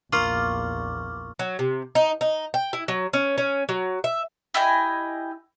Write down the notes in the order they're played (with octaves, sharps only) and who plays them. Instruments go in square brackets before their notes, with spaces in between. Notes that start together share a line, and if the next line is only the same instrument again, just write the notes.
[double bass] A#1 E2 [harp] A#3 [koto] F4 [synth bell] C#6 D6 F6
[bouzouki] F#3
C3
D#4
D#4
G5
E4
F#3
C#4
C#4
F#3
E5
[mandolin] E4 G4 D#5 G#5